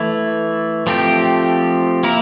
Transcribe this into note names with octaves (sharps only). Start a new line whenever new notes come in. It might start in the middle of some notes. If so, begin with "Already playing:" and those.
Already playing: E3 A3 E4
F3 A3 C4 G4
A#3 E4 A#4